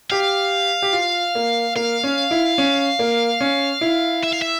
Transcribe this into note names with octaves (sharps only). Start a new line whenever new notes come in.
G4 F5
G4
F4
A#3
A#3 F5
C#4
E4
C#4
A#3
C#4
E4
E5
F5
E5